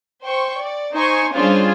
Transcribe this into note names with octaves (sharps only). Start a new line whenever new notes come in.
C5 G5 C#6
D5
D#4 C5 G#5 C#6
G3 C#4 D4 F4 G#4 C5